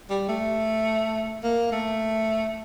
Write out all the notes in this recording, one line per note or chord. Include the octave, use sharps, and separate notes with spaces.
G3
A3
A#3
A3